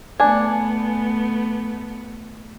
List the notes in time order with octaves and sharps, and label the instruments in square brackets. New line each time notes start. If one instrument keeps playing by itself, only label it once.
[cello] A3 B3 [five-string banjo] D4 G#5